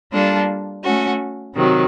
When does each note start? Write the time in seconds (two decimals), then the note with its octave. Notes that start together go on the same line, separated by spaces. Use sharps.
0.13 G3 A#3 D4 F4 A4
0.84 A3 C#4 F#4
1.55 C3 D#3 F#3